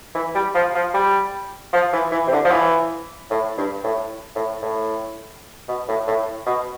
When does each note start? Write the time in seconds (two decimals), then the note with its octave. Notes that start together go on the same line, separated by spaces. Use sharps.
0.15 E3
0.35 G3
0.55 F3
0.74 F3
0.94 G3
1.73 F3
1.93 E3
2.12 E3
2.27 C3
2.32 D3
2.45 F3
2.51 E3
3.31 A2
3.57 G2
3.84 A2
4.35 A2
4.62 A2
5.68 B2
5.88 A2
6.07 A2
6.46 B2